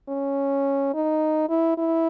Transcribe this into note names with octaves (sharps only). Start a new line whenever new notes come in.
C#4
D#4
E4
E4